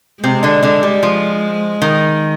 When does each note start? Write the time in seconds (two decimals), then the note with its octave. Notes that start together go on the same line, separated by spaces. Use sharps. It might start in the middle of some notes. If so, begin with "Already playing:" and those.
0.23 C3 G#3 C4
0.43 D3 D4
0.63 D3 D4
0.83 G3
1.03 F3
1.82 D#3